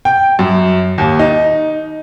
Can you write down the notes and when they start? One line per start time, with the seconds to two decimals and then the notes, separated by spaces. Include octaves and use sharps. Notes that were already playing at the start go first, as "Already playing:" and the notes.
0.05 G5
0.39 F#2
0.98 D#2
1.19 D#4